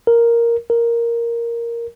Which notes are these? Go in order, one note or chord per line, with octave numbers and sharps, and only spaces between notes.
A#4
A#4